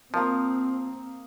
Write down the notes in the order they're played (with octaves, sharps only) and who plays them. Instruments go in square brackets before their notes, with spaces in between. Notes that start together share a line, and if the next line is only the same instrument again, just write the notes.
[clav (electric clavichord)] F3 [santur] A#3 F5 D#6 [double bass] C4 [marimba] A#4 A5